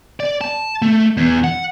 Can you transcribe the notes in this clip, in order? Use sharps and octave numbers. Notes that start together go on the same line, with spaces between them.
D5
A5
A3
E2
F#5